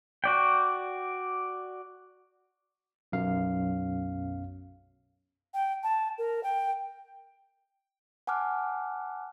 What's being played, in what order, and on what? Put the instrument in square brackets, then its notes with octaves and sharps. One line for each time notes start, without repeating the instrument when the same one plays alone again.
[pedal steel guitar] F#4 D5 G5
[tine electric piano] B1 F#2 F5
[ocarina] G5
A5
A#4
G5
[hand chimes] F#5 G#5 A5 D6 F6 F#6